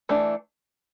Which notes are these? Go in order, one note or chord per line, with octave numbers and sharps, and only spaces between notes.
E3 A3 D4